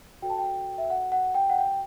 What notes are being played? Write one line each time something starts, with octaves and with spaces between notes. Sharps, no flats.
F#4 A4 C5 G5
A5
G5
E5
F#5
F#5
G5
F#5
G5